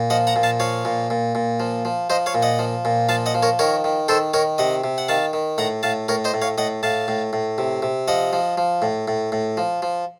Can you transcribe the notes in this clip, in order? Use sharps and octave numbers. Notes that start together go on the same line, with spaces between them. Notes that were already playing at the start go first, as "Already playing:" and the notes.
Already playing: A#2
F3 D#5 F#5
F#5 A#5
A#2
F5 A5
F3 C#5 F5
A#2
A#2
A#2
F3
F3
F3 C5 D#5
C#5 F5
A#2
D#5 F#5
F3
A#2
F3 F5 A5
D#5 F#5
F3
A#4 C#5
D#3 A#4 C#5
D#3
D#3 A4 C5
D#3 A#4 C#5
C3 D#5 F#5
C3
F#5
D#3 F5 A5
D#3
A2 F#5 A#5
A2 F5 A5
A2 A#4 C#5
C5 D#5
A2
C#5 F5
A2 D#5 F#5
A2 F5 A5
A2
A2
C3
C3
F3 D#5 F#5
F3
F3
A2
A2
A2
F3
F3